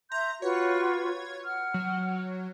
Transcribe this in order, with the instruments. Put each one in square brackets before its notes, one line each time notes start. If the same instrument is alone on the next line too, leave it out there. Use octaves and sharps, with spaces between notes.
[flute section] E5 C6 G6 [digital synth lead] A#5
[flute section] F4 F#4 B4 [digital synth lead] C#5
[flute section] F#5 F6
[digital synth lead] F#3